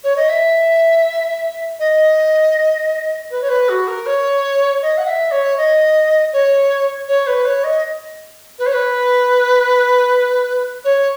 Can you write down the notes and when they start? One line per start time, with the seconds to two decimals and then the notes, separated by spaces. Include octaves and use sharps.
0.03 C#5
0.16 D#5
0.29 E5
1.79 D#5
3.30 B4
3.41 C#5
3.48 B4
3.69 F#4
3.87 A#4
4.06 C#5
4.82 D#5
4.97 F#5
5.07 E5
5.31 C#5
5.57 D#5
6.32 C#5
7.08 C#5
7.26 B4
7.45 C#5
7.63 D#5
8.58 B4
8.66 C#5
8.72 B4
10.84 C#5